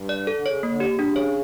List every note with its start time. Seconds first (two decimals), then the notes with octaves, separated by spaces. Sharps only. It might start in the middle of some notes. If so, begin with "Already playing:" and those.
Already playing: G2
0.09 D5
0.27 A4
0.35 D3
0.45 C#3 C#5
0.63 A#3
0.69 D3
0.80 G4
0.93 C#3
0.99 A#2 D4
1.08 C#3
1.16 C#5